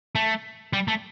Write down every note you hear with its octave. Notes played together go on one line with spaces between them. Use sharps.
A3
G3
A3